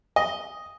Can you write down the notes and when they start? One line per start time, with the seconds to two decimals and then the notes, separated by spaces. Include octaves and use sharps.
0.16 D#5